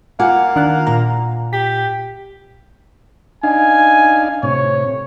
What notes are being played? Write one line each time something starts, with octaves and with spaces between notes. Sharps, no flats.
A#3 F4 F#5 G#5 D6
D#3 D4 F#6
A#2 A#5
G4 B6
D4 D#4 F5 G#5
A2 C3 C#5